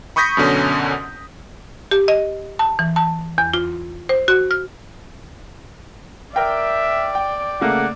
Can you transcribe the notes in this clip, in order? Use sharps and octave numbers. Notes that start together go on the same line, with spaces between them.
B5 C#6 D#6 G6 A#6 B6
F#2 B2 D3 C#4
G4
D#5
A5
E3
A5
E2
F4
C5
F#4
F6
A#4 D5 E5 G5
G5
C#3 A3 A#3 F#5